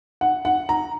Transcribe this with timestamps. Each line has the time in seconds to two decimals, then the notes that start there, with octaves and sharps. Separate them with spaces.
0.21 F#5
0.45 F#5
0.69 A#5